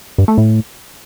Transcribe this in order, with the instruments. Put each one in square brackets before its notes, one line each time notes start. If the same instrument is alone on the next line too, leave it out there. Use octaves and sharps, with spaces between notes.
[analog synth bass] G2
A3
A2